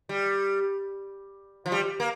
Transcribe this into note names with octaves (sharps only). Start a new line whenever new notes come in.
G3
F3
G3
A#3